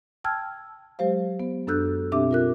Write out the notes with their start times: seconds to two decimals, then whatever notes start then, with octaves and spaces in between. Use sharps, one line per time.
0.24 G5 A5 E6 F6 G#6
0.99 F#3 G#3 G4 C5 F5
1.40 B3
1.67 F#2 D4 A4 E6 F#6 G6
2.12 B2 C4 D4 G4 E5 D6
2.31 F4 A#4 F#6